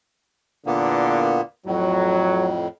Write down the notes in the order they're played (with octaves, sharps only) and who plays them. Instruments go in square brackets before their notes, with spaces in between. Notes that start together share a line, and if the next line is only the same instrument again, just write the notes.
[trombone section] E2 D3 [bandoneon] A#2 A#3 B3
[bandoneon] F2 A2 [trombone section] F#3